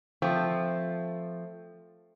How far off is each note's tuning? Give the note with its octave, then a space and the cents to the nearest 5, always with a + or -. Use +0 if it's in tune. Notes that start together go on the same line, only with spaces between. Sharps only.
F3 +0 A3 +0 C4 +0